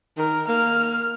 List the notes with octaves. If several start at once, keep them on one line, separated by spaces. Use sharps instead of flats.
D#3 A#4
A#3 F6